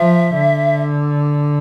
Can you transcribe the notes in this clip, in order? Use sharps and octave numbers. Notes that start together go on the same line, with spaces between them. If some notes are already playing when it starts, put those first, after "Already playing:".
Already playing: F3 E5
D3